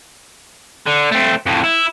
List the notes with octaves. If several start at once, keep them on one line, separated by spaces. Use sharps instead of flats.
D3
A3 C4
F2 A2
E4